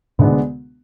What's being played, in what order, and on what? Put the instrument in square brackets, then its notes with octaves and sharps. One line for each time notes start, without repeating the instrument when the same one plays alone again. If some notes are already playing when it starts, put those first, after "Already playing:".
[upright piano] D2 D3 G#3 B3 D4 [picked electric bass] G#2 B2